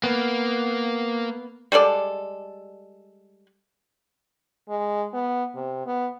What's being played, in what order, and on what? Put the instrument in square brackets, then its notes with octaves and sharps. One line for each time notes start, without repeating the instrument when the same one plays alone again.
[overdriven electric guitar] A#3 [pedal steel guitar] B3
[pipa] G3 G#3 A4 D5
[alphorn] G#3
B3
C3
B3